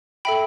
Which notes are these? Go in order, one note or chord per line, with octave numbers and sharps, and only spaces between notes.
A4 E5 G5 B5